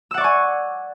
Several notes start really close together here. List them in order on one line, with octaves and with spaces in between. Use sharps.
E6 F#5 D5 C#6 G#5